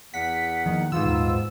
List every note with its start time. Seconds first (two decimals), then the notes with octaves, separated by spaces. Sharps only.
0.14 E2 F#5 B6
0.66 D#3 F3 A#3
0.92 G#2 E3 B3 F4 E6
1.04 D#2 A#2